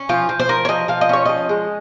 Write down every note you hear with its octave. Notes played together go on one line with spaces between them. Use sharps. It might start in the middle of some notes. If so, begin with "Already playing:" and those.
Already playing: C#4
F3 F4
F3
C5
F3 A#4
C#5
F3 D#5
F3 F5
D#5
C#4 C#5
F3 D#5
G#3